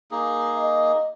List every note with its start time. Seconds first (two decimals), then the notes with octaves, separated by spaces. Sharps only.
0.11 A#3 D#4 G#4
0.58 D#5